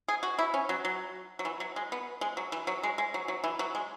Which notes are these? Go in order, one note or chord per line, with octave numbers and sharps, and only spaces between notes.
G#4
F#4
E4
C#4
F#3
F#3
F#3
E3
F#3
G#3
B3
G#3
F#3
E3
F#3
G#3
G#3
F#3
F#3
E3
F#3
G#3